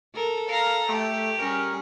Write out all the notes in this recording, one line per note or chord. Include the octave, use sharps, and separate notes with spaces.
A4 A#4
A#4 F5 A#5
A3 G4
G3 C#4 G#4 A#4